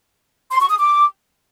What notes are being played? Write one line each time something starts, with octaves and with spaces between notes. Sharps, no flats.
C6
C#6
D#6
D6